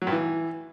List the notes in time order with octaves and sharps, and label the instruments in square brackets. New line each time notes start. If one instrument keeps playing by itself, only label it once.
[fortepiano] F#3
G2
E3